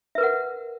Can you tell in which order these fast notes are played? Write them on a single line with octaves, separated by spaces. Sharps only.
E5 B4 A#4 F#5